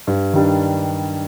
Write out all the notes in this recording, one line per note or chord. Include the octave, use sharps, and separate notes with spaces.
G2
D#3 G3 D4